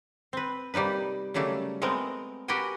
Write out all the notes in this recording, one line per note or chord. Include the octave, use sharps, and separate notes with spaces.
C4 B4
C3 G3 A#3 D#4 B4
C#3 F#3 G3 A3 A#3
G#3 A3 B3 C4 A#4
F#4 G4 A#4 B4 G5 G#5